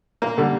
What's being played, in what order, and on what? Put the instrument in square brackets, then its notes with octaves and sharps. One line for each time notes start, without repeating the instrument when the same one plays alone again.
[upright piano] A#2 [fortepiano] A#3
[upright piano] D3 [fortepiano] G3